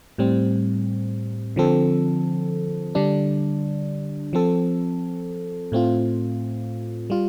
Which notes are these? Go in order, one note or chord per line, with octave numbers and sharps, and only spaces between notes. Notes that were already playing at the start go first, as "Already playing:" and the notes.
A2 G3 C4
D3 F3 C4 A4
D3 G3 D4
F3 C4 A4
A2 A3 C4 F4
G3 F4